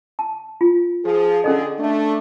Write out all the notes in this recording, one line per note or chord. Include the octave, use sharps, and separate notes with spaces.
A5
F4
F3 G#4
D3 C#4 G#4 A4 D#5
A3 D4